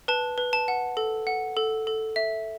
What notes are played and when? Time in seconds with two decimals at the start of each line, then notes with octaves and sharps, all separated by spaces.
0.08 B4 A5
0.38 B4
0.53 A5
0.68 F#5
0.97 A4
1.27 F#5
1.57 A4
1.87 A4
2.16 E5